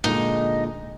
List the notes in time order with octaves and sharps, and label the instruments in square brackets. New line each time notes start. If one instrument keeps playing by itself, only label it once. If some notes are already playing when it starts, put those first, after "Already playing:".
[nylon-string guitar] A#2 D3 G#3 [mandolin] D#4